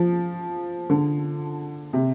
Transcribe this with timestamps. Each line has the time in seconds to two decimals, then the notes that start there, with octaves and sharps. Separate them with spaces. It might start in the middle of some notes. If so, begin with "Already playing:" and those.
Already playing: F3
0.90 D3
1.93 C3